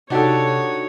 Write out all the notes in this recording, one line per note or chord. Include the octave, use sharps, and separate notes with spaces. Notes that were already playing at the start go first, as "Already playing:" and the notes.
C3 D4 D#4 F#4 G4 A4 C#5